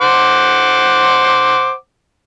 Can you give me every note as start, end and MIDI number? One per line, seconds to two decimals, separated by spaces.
0.01 1.74 72
0.01 1.74 78
0.01 1.74 86